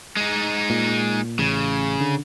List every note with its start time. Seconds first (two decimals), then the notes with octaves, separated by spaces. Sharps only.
0.17 G#3 D#4
0.70 A#2
1.39 A1 C#3
2.00 D3